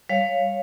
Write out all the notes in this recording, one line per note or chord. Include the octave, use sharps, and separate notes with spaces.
G3 C#5 F5